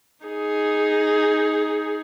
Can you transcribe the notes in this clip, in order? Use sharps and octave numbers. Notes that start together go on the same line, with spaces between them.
D#4 G#4